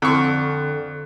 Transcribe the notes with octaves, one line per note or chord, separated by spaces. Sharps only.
F2 D3 C#6